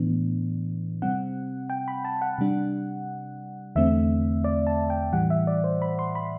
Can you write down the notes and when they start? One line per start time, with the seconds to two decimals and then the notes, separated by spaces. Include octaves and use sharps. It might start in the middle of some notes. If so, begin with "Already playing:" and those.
Already playing: A2 E3 B3 D4
1.02 C3 G3 C4 F#5
1.70 G5
1.88 B5
2.05 A5
2.22 F#5
2.38 C3 G3 D4
3.76 E2 D3 A3 C4 E5
4.44 D5
4.67 A5
4.90 G5
5.13 A2 E3 G3 F#5
5.30 E5
5.47 D5
5.64 C5
5.82 B5
5.99 C6
6.15 B5